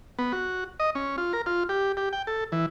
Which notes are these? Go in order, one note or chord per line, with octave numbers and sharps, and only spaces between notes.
B3
F#4
D#5
C#4
F4
A#4
F4
G4
G4
G5
A4
E3